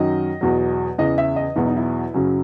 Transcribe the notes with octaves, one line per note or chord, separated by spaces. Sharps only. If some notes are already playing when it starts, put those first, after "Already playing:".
Already playing: F#2 D#3 F#3 D#5
E2 B2 F#3
E2 C#3 E3 D#5
E5
D#5
E2 B2 F#3 E4
D#4
E4
F#2 C#3 F#3